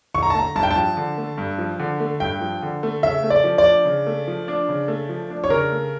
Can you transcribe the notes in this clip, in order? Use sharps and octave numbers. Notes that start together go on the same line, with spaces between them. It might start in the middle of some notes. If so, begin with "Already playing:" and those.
D3 C#6
A#5
A5
A3 A#5
G2 A5
G5
A5
F3
D3
A3
G2
F3
D3
A3
G2 G5
F3
D3
A3
C#3 E5
A3
D5
F3
D5
D4
C#3
A3
F3
D4
C#3
A3
F3
D4
C#5
C#3 A#4
A3